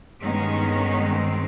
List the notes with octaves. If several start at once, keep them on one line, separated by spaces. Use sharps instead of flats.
G2 D#3 G#3 B3 C#4
C4